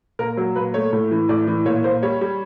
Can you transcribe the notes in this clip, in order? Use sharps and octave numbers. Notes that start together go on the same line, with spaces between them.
A#2 A#4
F#3
A#2 B4
A3 C#5
A2
E3
A2 D5
E3
A#2 C#5
A#2 C5
G3 C#5
G3